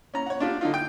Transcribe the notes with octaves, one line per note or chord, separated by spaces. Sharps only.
C#4 A#5
C#5 F#5
D4 F4 G4
D3 D#4 F4
G5